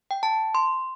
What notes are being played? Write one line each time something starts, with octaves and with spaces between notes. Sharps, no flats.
G5
A5
C6